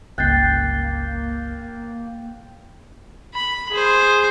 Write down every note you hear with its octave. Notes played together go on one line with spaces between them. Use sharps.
G1 C#2 A#3 G5 F#6 A6 C7
B5
G#4 C5